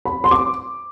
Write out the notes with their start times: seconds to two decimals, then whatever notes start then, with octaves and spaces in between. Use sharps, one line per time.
0.05 B5
0.24 C6
0.31 D6